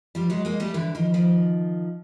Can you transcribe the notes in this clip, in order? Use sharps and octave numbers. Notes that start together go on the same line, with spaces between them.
F3 G3
F#3 G#3
G#3 A#3
G3 A3
D3 E3
D#3 F3
D#3 F3